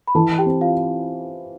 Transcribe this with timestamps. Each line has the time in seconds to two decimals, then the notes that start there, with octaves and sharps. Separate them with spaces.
0.07 B5
0.15 E3 A4 A5
0.38 G4 G5
0.46 C4
0.61 F4 F5